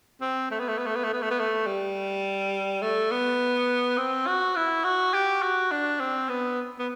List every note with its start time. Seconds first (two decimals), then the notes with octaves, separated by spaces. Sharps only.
0.21 C4
0.51 A3
0.59 B3
0.68 A3
0.78 B3
0.86 A3
0.95 B3
1.04 A3
1.13 B3
1.22 A3
1.31 B3
1.39 A3
1.66 G3
2.82 A3
3.11 B3
3.98 C4
4.27 F#4
4.56 E4
4.84 F#4
5.14 G4
5.42 F#4
5.71 D4
6.00 C4
6.29 B3
6.79 B3